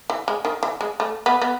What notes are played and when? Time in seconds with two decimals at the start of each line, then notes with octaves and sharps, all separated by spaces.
0.10 E3
0.28 G#3
0.45 D#3
0.63 E3
0.81 G#3
1.00 A3
1.26 B3
1.42 B3